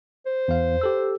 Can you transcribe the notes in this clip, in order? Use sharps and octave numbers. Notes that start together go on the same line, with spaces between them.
C5
E2 F5
G4 A4 E6